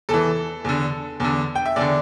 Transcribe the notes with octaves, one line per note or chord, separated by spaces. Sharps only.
E2 E3 A4
E2 D3
E2 D3
G5
E5
E2 D3 D5